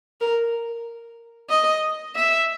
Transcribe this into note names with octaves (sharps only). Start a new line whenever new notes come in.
A#4
D#5
E5